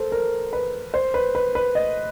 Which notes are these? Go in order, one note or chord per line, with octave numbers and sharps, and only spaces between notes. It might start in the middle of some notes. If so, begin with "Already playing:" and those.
Already playing: A4 A#4 C5
A#4
B4
C5
B4
B4
B4
D#5